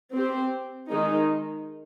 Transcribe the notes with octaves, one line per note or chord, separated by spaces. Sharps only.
C4 G4 C5
D#3 G#3 D#4